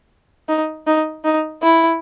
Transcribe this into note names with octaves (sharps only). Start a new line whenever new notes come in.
D#4
D#4
D#4
E4